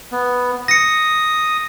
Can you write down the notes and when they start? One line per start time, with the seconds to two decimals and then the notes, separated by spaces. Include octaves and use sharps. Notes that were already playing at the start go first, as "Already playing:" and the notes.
0.12 B3
0.68 D#6 A#6 C#7